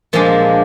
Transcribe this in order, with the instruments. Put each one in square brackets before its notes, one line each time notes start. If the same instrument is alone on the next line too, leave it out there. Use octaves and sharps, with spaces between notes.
[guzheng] A#2 F3 G#3 D4